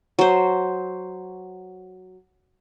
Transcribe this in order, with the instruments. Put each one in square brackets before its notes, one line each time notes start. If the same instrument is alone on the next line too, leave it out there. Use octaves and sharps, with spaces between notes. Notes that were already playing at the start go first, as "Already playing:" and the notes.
[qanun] F#3 C5